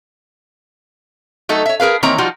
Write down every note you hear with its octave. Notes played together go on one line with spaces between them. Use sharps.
F#3 A3 D#4 A4
C#5 E5
G#4 A#4 B4 F5
D#3 E3 A#3 C4 C#5 A#5
F3 G3 D#4 F4 F#4